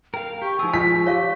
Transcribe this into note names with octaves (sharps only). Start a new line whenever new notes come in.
A#4 F5 G5
G4 C#6
F3 D#4 G#4 E6
F4 B6
G4 C#5 F5 C#6